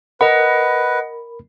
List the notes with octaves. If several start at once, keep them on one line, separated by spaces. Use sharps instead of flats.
A#4 B4 D#5 F#5 B5